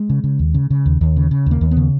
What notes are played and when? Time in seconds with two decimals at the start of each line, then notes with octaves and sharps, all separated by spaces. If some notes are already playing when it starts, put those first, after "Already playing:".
Already playing: G#3
0.10 C#3
0.24 C#3
0.39 D#2
0.54 C#3
0.70 C#3
0.86 D#2
1.01 D#2
1.16 C#3
1.31 C#3
1.46 D#2 A#3
1.61 D#2
1.71 B3
1.77 C#3